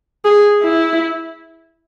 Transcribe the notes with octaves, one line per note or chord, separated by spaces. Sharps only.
G#4
E4